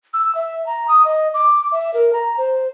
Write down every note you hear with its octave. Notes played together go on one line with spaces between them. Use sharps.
E6
E5
A#5
D#6
D#5
D6
E5
A#4
A#5
C5